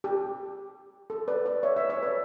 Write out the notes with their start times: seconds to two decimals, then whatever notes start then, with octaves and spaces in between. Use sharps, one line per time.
0.04 G4
1.10 A4
1.28 B4 D5
1.45 B4 D5
1.63 C#5 E5
1.76 C#5 E5
1.90 C#5 E5
2.03 B4 D5